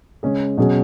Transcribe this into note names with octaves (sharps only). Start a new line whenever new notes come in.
C#3 G#3 C#4 G#4
B2 F#3 C#4 G#4